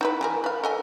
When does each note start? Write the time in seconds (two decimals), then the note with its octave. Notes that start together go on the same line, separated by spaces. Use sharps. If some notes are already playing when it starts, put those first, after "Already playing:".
0.01 D#4 E4 B4
0.21 E3 G#4 A#4
0.44 B4 F5
0.64 A4 D#5 G#5